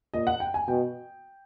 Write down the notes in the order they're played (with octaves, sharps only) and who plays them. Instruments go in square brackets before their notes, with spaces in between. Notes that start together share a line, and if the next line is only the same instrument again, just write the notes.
[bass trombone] A#2 [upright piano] D#5
[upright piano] F#5
G5
G#5
[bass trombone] B2 [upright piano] G5